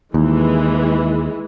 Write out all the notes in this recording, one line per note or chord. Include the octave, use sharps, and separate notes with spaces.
D#2 E3 G#3